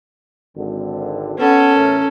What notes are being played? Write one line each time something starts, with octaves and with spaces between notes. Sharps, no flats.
G#1 D3
B3 C#4 A4
E2 A2 A#4